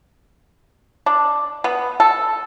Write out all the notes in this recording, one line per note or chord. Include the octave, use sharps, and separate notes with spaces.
D4
B3
A4